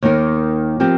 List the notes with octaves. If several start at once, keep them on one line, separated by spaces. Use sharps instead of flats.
D#2 D#3 A#3 D#4 A#4
F3 C4 G4 A#4